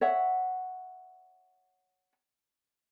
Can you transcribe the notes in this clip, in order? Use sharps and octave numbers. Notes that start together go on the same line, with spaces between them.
C#5 E5 F#5